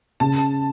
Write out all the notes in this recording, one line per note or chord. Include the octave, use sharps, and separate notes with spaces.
C#3 A5